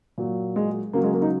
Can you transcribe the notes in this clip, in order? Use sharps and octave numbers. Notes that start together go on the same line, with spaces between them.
A#2 F#3
G#3
C#3 F#3 A#3
G#3
A#3
D#4